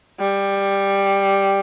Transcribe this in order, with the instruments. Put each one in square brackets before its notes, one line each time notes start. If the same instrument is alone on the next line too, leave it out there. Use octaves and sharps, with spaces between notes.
[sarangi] G3